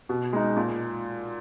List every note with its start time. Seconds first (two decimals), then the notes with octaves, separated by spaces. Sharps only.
0.09 B2
0.33 G#3 D#4
0.57 A#2